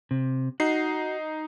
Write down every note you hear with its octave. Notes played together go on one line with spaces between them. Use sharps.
C3
D#4 F#4 C7